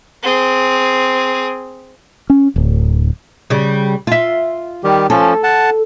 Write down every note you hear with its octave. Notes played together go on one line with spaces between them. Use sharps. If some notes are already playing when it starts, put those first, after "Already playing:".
C4 G#4
C#4
D1
C#3 G3
F4 E5
D#3 G3 G4
F3 C#4 A4
F#5 A5